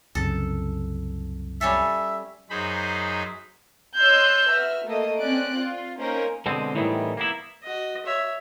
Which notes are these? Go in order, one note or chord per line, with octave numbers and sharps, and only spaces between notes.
C2 F#2 C#3 A4
G3 C#4 A4 E5
F#2 D#4 G#4 C5 B5
C#5 D#5 C6 E6 F#6 G6
F#4 B4 E5 F6
A3 A#3 D#5
C4 C#4 D5 F#6 D7
F4
A#3 C#4 D#4 A#4 C5
B2 D3 G#3 C4
A2 D#3 E3 G3 B3
A#3 B3 E4
F#4 D#5
C#5 E5